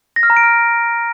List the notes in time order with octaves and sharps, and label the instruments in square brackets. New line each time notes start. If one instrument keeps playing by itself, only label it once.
[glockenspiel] A#6
F6
A#5
D7
F6